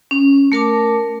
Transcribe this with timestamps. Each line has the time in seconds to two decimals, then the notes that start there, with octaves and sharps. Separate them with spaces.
0.11 C#4
0.52 A3 A#4 A5 D6